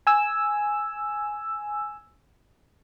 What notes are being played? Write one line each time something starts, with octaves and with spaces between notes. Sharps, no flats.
G#5 E6